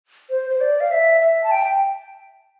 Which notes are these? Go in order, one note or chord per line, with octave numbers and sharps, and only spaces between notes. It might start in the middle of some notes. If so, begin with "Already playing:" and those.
C5
C5
D5
F5
E5
E5
A5
G5